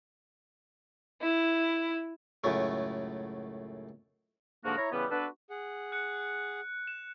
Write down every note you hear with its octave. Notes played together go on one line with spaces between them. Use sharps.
E4
C#2 F#2 A2 A3
G#2 D3 F3 A#3 D4 F#4
E4 C#5 A#5
C#3 E3 G3 B3 B4
B3 D4 F#4 A4 B4
G#4 F#5
F#6 C#7
E7